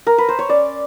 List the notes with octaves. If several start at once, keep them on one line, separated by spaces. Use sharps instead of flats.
A#4
B4
C5
C#5
C#4 D5